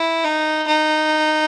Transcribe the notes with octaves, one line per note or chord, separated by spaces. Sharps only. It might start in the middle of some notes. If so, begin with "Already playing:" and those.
Already playing: E4
D#4
D#4